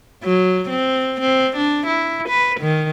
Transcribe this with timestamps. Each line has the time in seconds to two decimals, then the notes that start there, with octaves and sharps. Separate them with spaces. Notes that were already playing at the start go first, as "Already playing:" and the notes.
0.24 F#3
0.69 C4
1.21 C4
1.57 D4
1.87 E4
2.29 B4
2.60 D#3